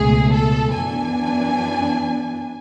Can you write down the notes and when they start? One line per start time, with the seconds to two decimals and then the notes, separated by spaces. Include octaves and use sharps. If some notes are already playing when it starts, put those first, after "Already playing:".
Already playing: C#2 B2 A3 G#4
0.31 A4
0.73 F#2 E3 B3 D4 G#5